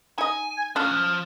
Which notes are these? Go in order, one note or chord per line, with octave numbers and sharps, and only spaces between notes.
D#4 D#5 G#5
G#6
A2 C#4 D4 F4 A4 F6
F3